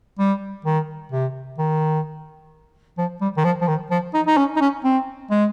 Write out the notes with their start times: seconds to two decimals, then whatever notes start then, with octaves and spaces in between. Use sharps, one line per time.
0.19 G3
0.65 D#3
1.12 C3
1.58 D#3
2.98 F3
3.21 G3
3.37 D#3
3.44 F3
3.61 F3
3.68 D#3
3.91 F3
4.14 D#4
4.26 D#4
4.37 C#4
4.56 D#4
4.61 C#4
4.84 C4
5.31 G#3